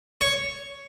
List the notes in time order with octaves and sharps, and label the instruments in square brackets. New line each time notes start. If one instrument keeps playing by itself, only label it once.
[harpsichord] C#5